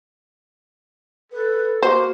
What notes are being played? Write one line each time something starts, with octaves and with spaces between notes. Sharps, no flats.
A4 B4
A#3 F#4 C5